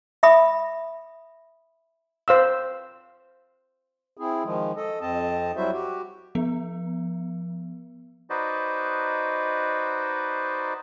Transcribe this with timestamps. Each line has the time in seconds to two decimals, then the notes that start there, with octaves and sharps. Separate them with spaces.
0.23 E5 B5 D#6
2.28 C5 F5 E6
4.17 C4 E4 G#4
4.44 D#3 F3 G#3
4.77 A4 D#5
5.01 F2 C4 D#5 A5
5.56 F#3 G3 E4 F#4 C5 E5
5.72 F#4 G4
6.35 F3 B3
8.30 D#4 F#4 B4 C5 D5 D#5